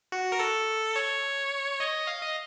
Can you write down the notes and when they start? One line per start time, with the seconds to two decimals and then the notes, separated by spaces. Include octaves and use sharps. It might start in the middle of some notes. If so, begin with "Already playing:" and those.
0.12 F#4
0.32 A#4
0.39 A4
0.96 C#5
1.80 D#5
2.07 F5
2.21 D#5